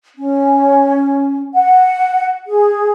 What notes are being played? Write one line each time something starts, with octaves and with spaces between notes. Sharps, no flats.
C#4
F#5
G#4